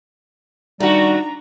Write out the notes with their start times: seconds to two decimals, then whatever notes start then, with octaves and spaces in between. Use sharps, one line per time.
0.80 D#3 G3 A3 D4 F#4 A#5